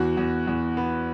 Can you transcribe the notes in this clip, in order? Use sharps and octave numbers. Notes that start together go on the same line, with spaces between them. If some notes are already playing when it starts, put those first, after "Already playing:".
Already playing: E2 F#4
E2
E2
B3